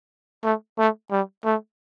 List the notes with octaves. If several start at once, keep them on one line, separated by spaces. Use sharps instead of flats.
A3
A3
G3
A3